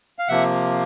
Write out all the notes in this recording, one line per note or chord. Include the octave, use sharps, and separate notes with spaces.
F5
C3 F3 A#3 E5 F#5